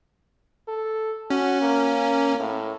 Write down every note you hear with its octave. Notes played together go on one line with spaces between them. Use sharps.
A4
C#4 F#4
A#3
A2